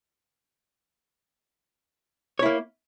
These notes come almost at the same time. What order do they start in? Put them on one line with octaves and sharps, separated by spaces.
C#5 E4 A#3